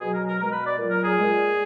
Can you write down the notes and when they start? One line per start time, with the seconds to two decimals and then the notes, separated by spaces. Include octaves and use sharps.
0.01 B2 F#3 G#4
0.14 A#4
0.27 A#4
0.40 B2 G#3 A#4
0.52 B4
0.66 D5
0.78 A#2 F#3
0.91 A#4
1.04 G#4
1.17 A#2 G#3